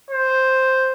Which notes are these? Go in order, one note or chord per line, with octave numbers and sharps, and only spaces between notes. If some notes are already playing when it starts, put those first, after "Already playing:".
C5